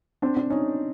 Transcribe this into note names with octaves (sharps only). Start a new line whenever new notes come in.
C4 D4
C4 D4
C#4 D#4